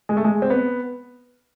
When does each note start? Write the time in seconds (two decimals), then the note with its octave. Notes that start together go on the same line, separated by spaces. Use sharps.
0.09 G#3
0.17 A3
0.24 G#3
0.42 C4
0.50 B3